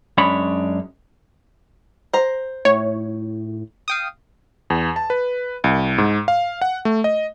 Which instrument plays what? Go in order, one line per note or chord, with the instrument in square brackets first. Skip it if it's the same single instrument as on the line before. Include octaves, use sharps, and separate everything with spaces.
[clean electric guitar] F#2 G#3 C#4 D4 C#5 B5
[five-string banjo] C5 A#5
[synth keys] A2 [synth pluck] C#5
[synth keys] F5 G5 D#6
[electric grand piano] E2
A5
B4
C2
G#2
F5
F#5
A3
D#5